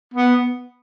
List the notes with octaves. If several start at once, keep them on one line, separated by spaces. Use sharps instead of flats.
B3